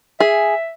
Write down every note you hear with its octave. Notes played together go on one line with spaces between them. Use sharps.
G#4 E5